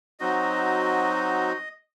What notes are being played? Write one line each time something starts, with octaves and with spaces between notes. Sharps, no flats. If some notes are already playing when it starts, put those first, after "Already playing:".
F#3 C4 D#4 F#4 D#5